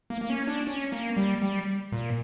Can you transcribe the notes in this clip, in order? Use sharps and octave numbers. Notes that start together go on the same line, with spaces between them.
A#3
A#3
C#4
D4
C#4
A#3
G3
G3
A#2